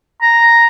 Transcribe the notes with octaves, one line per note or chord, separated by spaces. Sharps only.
A#5